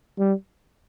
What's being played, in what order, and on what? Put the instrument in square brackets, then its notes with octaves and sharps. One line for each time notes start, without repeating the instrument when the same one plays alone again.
[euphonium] G3